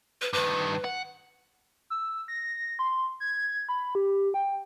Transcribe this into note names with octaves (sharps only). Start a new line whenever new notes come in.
B4
G2 D#3 B4
F#5
E6
A#6
C6
G#6
B5
G4
G5